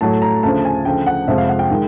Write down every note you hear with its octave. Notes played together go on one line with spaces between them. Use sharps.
A2 F#3 A3 A5
A#5
D2 C#3 F3 A5
G#5
D2 C#3 F3 G5
F#5
F2 C3 F3 G#3 E5
F5
F#5
G5
D#3 G#3